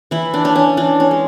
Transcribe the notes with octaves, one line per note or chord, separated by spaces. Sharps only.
E3 E4
D4
C#4 D4
C#4
E3 D4
C#4
G#3